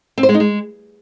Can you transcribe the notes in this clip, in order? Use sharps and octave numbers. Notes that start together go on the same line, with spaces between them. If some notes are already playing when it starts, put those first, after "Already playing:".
C4
C5
G#3
D#4
G#3